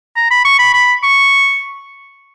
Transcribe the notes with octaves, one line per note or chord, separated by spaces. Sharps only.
A#5
B5
C#6
B5
B5
C#6